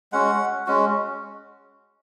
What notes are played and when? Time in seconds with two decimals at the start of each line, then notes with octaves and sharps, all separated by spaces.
0.12 G#3 C#4 F#4 F#5
0.67 G#3 C#4 F#4